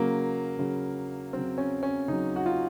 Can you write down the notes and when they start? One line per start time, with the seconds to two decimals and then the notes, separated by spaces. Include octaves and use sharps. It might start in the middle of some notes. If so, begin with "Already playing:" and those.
Already playing: C#3 F#3 A#3
0.58 C#3 F#3
1.33 C#3 F#3 C4
1.58 C#4
1.83 C#4
2.08 C#3 F#3 D#4
2.36 F#4
2.46 F4